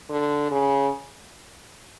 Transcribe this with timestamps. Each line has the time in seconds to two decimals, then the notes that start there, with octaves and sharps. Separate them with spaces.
0.09 D3
0.51 C#3